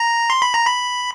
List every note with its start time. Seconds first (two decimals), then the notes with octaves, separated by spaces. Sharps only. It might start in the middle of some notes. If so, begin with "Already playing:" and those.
Already playing: A#5
0.30 C6
0.42 B5
0.54 A#5
0.66 B5